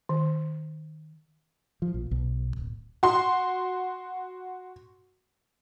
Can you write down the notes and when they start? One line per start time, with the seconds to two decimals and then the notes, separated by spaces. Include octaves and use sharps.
0.09 D#3
1.82 F3
1.94 A#1
2.11 B1
2.57 D1
3.03 F#4 C6